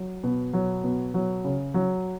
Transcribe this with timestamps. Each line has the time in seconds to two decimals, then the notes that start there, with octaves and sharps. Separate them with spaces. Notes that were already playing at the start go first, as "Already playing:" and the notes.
Already playing: F#3
0.24 B2
0.53 F#3
0.84 B2
1.14 F#3
1.44 C#3
1.74 F#3